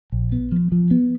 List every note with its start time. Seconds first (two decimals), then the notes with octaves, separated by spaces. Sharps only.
0.12 A#1
0.32 B3
0.52 F3
0.72 F3
0.91 B3